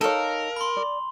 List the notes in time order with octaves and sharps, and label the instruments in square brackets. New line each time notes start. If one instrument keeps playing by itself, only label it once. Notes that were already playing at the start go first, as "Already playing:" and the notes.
[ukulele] D#4 C#5 [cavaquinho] A4 F5 [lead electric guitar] A#4
[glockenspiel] B5 C6
[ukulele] D5